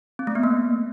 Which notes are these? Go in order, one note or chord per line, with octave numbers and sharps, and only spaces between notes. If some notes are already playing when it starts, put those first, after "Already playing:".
C4
A3
B3
A#3